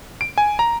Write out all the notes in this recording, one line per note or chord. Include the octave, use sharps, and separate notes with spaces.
D7
G#5
A#5